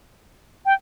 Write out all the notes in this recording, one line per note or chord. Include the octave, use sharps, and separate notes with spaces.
G5